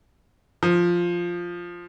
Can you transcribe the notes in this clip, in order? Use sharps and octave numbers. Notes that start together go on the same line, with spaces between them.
F3